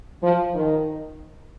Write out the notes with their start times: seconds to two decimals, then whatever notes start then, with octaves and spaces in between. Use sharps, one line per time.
0.22 F3
0.55 D#3